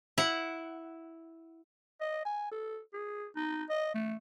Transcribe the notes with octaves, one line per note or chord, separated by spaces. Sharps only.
E4 F#5
D#5
G#5
A4
G#4
D#4
D#5
A3